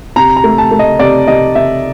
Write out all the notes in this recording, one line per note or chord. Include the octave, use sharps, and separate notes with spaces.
C3 A#5
A#5
A3
A5
A3
D#5
C3 D5
C3 D#5
C3 E5